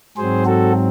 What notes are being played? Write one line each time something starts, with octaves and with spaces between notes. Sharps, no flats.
G#2 F#3 C4 G#4 C5
F#4 A4